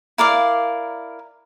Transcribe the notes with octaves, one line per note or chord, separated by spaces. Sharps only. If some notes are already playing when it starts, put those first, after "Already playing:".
E4 A#4 D5 F5